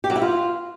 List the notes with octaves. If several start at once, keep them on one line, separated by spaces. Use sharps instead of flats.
G4
F#3
E4
F4